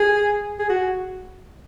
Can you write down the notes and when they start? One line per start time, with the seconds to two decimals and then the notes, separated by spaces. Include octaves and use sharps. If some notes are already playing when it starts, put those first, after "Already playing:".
Already playing: G#4
0.59 G#4
0.69 F#4